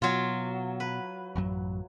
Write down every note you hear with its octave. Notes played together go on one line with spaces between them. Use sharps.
B2 F#3 F4
B4
A1 F#2 F#3